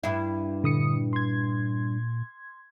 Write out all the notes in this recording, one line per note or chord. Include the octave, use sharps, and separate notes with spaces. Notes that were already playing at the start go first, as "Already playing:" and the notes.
G2 E4
A#2 D3 D#6 C#7
C6 G#6